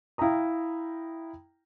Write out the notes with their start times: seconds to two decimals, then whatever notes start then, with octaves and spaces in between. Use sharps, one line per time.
0.18 E4 F5 G5 A#5 D#6